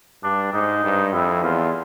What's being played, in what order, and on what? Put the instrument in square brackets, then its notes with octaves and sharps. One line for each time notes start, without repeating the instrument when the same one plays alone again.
[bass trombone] G2 [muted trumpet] D4
[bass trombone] G#2 [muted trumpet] D#4
[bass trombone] G2
[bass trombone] F2 [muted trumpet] E4
[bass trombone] E2 [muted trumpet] F4